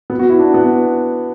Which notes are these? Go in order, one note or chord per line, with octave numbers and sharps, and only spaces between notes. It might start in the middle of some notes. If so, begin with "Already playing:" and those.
B3
F#4
E4
D4
B3